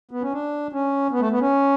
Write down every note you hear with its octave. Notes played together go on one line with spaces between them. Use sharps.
B3
C#4
D4
C#4
B3
A3
B3
C#4